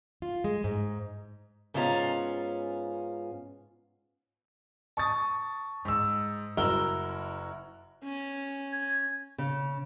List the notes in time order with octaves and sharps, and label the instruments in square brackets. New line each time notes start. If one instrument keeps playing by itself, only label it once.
[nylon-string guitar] F4
G#3
G#2
[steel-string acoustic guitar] G#2 B3 C#4 F4 A5 A#5
[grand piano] A5 C#6 D#6 A6
G#2 E6
F#1 E4 F#4 A#4 E6 G7
[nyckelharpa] C#4
[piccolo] G#6
[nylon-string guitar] C#3